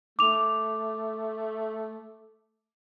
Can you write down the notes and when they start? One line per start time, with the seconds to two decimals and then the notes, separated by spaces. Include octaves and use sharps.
0.19 A3 D6 F7